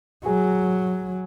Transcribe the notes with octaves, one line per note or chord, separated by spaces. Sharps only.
F#3 G#4